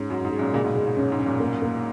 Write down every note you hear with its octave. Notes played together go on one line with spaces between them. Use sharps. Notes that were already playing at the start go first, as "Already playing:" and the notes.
Already playing: G#2 G#3 C#4
F#2 F#4
G#2
G#3
F#2 A#2
A#2 C#3 G#3
G#2 B2
G#3
G#2
F#2 C#4
G#2
C#4
F#2 A#2
A#3
A#3